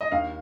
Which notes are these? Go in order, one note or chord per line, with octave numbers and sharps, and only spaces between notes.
D#5
D#2 F5